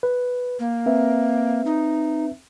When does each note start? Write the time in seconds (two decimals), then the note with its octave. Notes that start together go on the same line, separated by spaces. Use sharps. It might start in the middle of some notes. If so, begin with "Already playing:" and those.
0.03 B4
0.59 A#3
0.86 C4 B4 E5
1.65 D#4